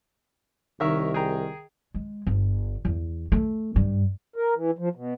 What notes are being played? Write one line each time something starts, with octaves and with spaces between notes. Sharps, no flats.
C2 D#3 A#4 C#5 E5
G#4 G5 A#5
G#3
G1
E2
A3
G2
A#4
E3
F3
B2